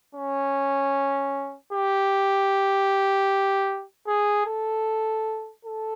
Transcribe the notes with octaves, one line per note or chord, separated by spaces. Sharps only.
C#4
G4
G#4
A4
A4